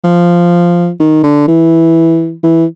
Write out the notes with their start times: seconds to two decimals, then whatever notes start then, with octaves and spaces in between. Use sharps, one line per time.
0.04 F3
1.00 D#3
1.23 D3
1.48 E3
2.43 E3